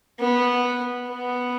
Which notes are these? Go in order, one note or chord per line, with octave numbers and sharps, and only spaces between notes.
B3
B3